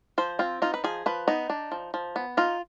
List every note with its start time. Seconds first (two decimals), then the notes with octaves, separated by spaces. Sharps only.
0.18 F3 C5
0.39 C4 F4
0.62 D#4 F4
0.74 B4
0.84 F3 G#4
1.06 F3 B4
1.28 B3 D#4
1.50 D4
1.72 F3
1.94 F3
2.16 B3
2.37 D#4 F4